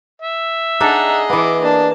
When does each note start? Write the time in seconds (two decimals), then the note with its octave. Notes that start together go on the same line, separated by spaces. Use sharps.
0.22 E5
0.80 D4 D#4 G#4 A4 D#5 F#5 A#5
1.30 E3 B3 E5 D6
1.62 A#3 D4 A5